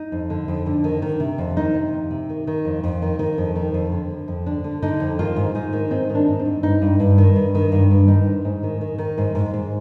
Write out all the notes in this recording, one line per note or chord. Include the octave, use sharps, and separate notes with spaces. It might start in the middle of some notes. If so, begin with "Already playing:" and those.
Already playing: D#4
F2
D3
F2
D3
D#3
D#3
C3
F2
D#3 D#4
C3
F2
C3
D#3
D#3
F2
F2
D#3
D#3
F2
D#3
F2
D3
D3
F2
D3 D4
D3
D3 D#4
F2
D#3 F4
G#2
G#2 D#4
D#3
G#2 C4
D#3
D4
G#2
C4
G#2
G2 D#4
G2
G2
D#3
G2
D#3
G2
G2
D#3 D#4
G#2
G#2
D#3
D#3
D#3
G#2
G#2
G#2